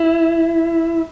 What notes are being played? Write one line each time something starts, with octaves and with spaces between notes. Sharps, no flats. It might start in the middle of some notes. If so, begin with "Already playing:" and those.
Already playing: E4